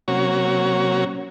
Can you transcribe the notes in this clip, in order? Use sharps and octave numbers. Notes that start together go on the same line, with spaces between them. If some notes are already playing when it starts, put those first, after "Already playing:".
C3 F#3 A#3 C#4 F#4 C#5